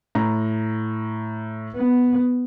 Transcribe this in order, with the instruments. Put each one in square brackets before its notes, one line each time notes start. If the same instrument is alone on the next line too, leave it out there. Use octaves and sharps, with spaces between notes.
[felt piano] A2 A#5
[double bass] B3